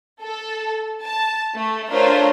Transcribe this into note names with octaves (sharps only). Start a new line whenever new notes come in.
A4
A5
A3
A3 D4 F4 A#4 C5 C#5